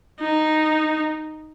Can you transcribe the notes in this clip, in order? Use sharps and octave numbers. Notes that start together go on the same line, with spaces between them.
D#4